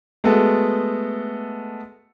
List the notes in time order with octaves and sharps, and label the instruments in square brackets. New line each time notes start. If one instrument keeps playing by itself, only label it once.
[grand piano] G#3 A3 B3 F#4 G#4 A4